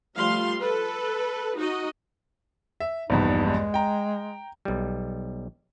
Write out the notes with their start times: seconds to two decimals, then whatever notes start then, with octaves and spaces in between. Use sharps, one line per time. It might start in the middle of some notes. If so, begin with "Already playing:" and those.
0.16 F3 G3 A3 F5 C6
0.60 A4 B4
1.57 D#4 F#4 D#5
2.80 E5
3.10 A#1 E2 G2 D#4
3.45 G#3
3.74 G5 A#5
4.65 B1 G3